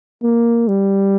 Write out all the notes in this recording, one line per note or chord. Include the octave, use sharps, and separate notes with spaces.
A#3
G3